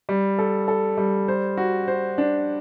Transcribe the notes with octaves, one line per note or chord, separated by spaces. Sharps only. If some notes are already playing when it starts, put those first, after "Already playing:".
G3
A4
A4
G3
C5
F#4
C5
D4